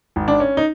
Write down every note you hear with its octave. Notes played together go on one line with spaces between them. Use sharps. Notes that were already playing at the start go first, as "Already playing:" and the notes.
G#1
D4
C#4
D#4